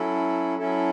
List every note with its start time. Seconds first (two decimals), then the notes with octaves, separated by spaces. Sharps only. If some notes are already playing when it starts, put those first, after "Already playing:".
Already playing: F#3 C#4 E4 A4
0.58 F#3 C#4 E4 A4